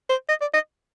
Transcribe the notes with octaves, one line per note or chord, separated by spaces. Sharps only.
C5
D#5
D5
D#5